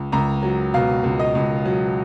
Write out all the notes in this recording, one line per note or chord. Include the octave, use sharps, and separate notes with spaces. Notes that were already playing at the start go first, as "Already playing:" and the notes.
Already playing: C#2
C#2 A#5
F#3
B2 F5
C#2
D#5
C#2
F#3